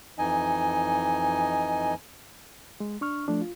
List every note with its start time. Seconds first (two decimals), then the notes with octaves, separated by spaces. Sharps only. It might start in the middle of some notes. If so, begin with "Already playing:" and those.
0.18 F2 E3 D#4 D#5 G#5
2.80 G#3
3.01 D4 C#6 F6
3.28 F3 A3 D4
3.41 F4